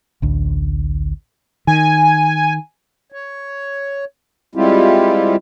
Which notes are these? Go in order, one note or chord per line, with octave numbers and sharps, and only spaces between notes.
A1 D2
D#3 G#5
C#5
G3 G#3 C4 E4 F4 G4